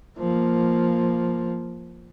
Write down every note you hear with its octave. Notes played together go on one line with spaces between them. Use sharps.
F3 A#3